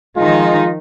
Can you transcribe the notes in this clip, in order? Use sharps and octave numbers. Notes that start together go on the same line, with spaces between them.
D#3 F3 G#3 D#4 F4